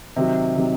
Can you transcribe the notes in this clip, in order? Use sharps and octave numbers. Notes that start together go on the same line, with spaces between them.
C3 D#3 F#3
C3 D#3 F#3